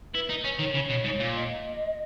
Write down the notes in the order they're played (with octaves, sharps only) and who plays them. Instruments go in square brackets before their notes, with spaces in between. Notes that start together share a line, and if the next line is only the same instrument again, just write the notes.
[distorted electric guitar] E4 [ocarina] B4
[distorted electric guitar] D#4
[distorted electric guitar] C#4 [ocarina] C#5
[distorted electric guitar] D#3
[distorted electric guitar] C#3 [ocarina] C#5
[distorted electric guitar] B2
G#2
A#2
[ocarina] D#5